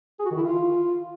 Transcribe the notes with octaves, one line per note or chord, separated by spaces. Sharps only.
G#4
F#4
D#3
E4
F4